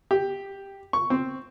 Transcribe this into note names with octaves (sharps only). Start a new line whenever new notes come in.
G4
C#6
C4